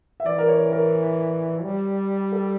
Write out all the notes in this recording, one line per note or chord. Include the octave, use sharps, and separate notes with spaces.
E5
E3 D5
A#4
C#5
A#4
G3
A4